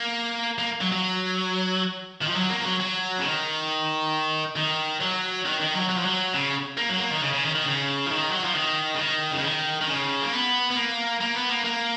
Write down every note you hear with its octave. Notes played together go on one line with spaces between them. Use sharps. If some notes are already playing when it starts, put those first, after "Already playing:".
Already playing: A#3
A#3
F#3
F#3
D#3
F3
F#3
A#3
F3
F#3
F#3
C#3
D#3
D#3
F#3
D#3
D#3
F#3
F#3
F3
F#3
C#3
A#3
F#3
A#3
D#3
C#3
C#3
D#3
D#3
C#3
F3
D#3
F#3
F3
D#3
C#3
D#3
C#3
D#3
D#3
C#3
A#3
B3
B3
A#3
A#3
B3
A#3
A#3